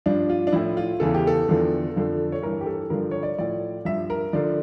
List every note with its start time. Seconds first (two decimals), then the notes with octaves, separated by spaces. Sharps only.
0.06 G2 F3 D4
0.29 F4
0.47 D4
0.52 A2 F3 E4
0.77 F4
1.00 E2 C#3 E3 A4
1.14 G4
1.27 A4
1.48 E2 D3 F3
1.96 F2 D3 F3
2.32 C#5
2.42 G2 E3 A#4
2.61 G4
2.66 A4
2.90 G2 D3 F3 A#4
3.11 C#5
3.23 D5
3.38 A2 F3 D5
3.85 G2 F3 E5
4.10 A#4
4.33 D3 F3 D5